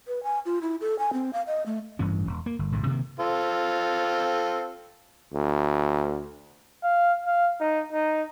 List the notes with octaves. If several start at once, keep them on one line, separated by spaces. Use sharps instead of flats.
B4
G#5
F4
E4
A4
G#5
C4
F5
D#5
A3
A1 G2 E3 C#4
E1
A#3
G1
G1 C#2 A2
C3 D#3 A#3
C4 F4 A4
D2
F5
F5
D#4
D#4